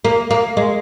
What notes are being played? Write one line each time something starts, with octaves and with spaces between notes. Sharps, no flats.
A#3
A#3
G#3